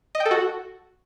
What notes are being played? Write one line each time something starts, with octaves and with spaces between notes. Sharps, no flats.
D#5
G5
A4
F#4